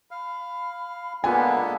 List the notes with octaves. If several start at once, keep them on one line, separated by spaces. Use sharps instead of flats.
F5 B5
G#3 A#3 B3 D4 F4 A4 G#5